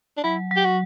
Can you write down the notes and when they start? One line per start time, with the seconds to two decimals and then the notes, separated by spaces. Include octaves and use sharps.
0.17 D4
0.23 F#3 E4
0.51 F#3 G4
0.65 F#4